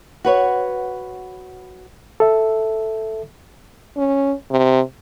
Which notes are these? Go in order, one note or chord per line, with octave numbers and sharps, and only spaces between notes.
F#4 B4 C#5
A4 E5
C#4
C3